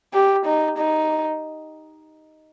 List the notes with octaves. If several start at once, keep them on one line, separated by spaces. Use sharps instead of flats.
G4
D#4
D#4